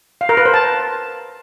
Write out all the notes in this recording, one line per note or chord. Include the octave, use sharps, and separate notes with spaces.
F5
A#4
B4
C5
A5